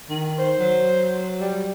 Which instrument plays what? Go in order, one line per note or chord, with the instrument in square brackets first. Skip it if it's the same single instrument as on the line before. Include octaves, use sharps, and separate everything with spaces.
[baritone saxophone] D#3
[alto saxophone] C5
[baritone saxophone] F#3
[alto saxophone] G3